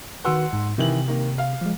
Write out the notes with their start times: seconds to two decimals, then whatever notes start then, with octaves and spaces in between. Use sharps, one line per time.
0.25 D#3 F#4 B4 F#5 C6 E6
0.53 G#2
0.78 C3 D#3 E3 F#7
1.07 D#3 A#3
1.38 F5
1.61 F3 G#3